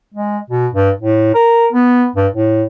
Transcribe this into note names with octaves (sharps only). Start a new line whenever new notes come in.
G#3
B2
G2
A2
A#4
B3
G2
A2